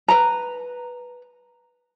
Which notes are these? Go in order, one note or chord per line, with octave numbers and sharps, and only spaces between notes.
B4 A#5